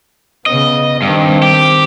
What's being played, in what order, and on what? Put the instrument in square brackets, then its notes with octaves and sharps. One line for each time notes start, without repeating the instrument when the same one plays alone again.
[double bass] C#3 B3 [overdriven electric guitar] D#5
[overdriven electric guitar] G2 [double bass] D#3 C4
[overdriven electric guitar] G4